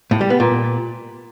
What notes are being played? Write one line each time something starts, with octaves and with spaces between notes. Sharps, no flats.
A2
G3
B3
A#2